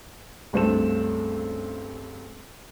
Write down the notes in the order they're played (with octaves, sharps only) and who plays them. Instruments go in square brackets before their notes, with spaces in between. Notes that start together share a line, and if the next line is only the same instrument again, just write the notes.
[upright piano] C#2 G2 A3 C4 A4 E7